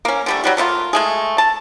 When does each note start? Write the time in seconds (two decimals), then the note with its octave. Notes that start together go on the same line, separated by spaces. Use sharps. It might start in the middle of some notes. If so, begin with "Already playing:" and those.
0.05 A#3 C#4
0.26 D3 G3 A3
0.44 F#3 G3 F#4
0.57 A3 A#3 D#4 F4
0.93 G#3 A3 G#4
1.38 A5